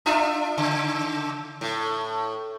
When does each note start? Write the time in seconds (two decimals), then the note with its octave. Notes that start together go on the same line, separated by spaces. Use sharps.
0.06 D4 F4 E5
0.57 C#3
1.61 A2